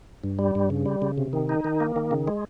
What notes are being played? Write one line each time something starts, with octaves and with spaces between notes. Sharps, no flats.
G2
G3
G2
C#3
G3
C#3
C3
D#3
D#4
D#3
A#3
D#3
C#3
G#3